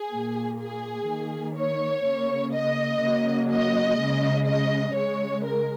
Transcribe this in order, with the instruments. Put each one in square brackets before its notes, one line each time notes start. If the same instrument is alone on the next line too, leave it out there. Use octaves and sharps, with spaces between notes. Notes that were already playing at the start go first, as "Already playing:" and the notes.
Already playing: [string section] G#4
A#2 A#3
G#4
D#3 A#3
C#5
C#3 A#3
D#5
C#3 F#3 A#3
D#5
C#3 G#3
D#5
C#3 G#3 C#5
A#4